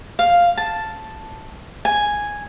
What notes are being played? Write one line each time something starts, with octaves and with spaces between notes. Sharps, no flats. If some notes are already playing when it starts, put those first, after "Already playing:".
F5
A5
G#5